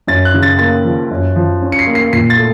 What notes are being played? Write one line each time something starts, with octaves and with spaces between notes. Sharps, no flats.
F#2 A6
F#6
C#3
A6
A#3 A6
F3
F#2
F3
C#4
C#7
C7
A#3
C7
A#2 C7
A6
A3